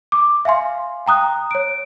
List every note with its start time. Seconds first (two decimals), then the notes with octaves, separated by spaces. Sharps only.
0.12 D6
0.45 E5 F5 G#5 C6
1.06 G5 A#5 D#6 F#6
1.51 C#5 D7